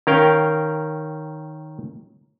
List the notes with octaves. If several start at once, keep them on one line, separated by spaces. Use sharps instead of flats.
D#3 C#4 A#4 F5 G5